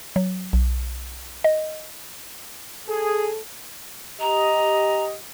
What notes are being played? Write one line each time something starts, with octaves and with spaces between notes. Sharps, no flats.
F#3
B1
D#5
G#4 A4
G4 D#5 A#5